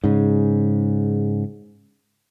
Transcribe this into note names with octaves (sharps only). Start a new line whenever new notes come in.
G#2 C#3